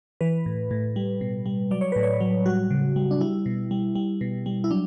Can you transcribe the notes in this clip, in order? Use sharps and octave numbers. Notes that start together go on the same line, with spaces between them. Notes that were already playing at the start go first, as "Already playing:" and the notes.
E3 B4
A2
A2
G3
B2
G3
F#3 D5
C#5
A2 B4
C#5
F#3
G3 F#4
C#3
G3
D4
G3 E4
B2
G3
G3
B2
G3
E4
F#3 D4